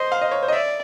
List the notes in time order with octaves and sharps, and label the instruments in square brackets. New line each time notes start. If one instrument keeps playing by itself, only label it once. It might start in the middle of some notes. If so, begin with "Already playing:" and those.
Already playing: [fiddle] C5 [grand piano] D#5
[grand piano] F5
D#5
C#5
C5
D#5
[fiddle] D5 [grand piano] E5